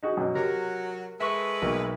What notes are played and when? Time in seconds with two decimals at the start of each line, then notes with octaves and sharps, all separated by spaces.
0.03 D#4 F#4 G#4
0.17 F#2 B2
0.35 C3 F#3 F#4 A#4
1.20 G#3 A4 B4 E5 C#6
1.62 B1 B2 A#3